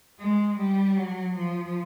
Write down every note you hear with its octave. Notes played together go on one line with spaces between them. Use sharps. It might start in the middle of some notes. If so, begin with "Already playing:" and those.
G#3
G3
F#3
F3